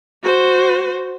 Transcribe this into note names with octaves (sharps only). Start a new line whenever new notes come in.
F#4 C5